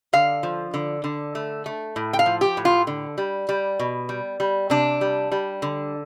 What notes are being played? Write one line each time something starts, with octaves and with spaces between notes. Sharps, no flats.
D3 F5
F3
D3
D3
A3
A3
A2
G5
F5
F3
G4
A2
F4
D3
G3
G3
B2
G3
G3
C3 D4
G3
G3
D3